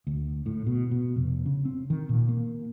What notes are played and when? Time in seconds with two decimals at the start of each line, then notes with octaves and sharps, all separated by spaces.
0.07 D2
0.46 A2
0.67 B2
0.91 B2
1.16 F1
1.46 C#3
1.65 C4
1.90 D#3
2.09 A#2
2.29 A#3